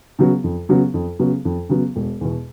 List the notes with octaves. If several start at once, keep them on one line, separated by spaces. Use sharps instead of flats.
C#3 F#3 B3
F2
C#3 F#3 B3
F2
C#3 F#3 B3
F2
C#3 F#3 B3
E1
E2 B2